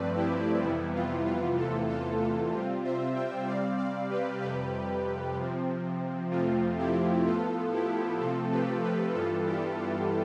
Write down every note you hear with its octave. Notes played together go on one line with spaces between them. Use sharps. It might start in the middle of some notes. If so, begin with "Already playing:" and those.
Already playing: G2 F3 A3 C4 B4 D5
E4 G4
F2 C3 E3 G3 B3 E4
F4
F4
E2 C3 E3 A3 F4 A4
F4 A4
F4
C3 G3 C4 F4
C5 E5
E5 G5
C3 G3 C4 D5 F5
D5 F5
G4 B4
F2 C3 G3 G4 B4
C3 F3 C4
F2 C3 F3 A3 C4 F4
E4 G4
A2 F3 B3 F4 A4
E4 G4
C3 F3 A3 C4 F4 A4
G4 B4
G4 B4
G2 E3 G3 B3 F4 A4
E4 G4
F4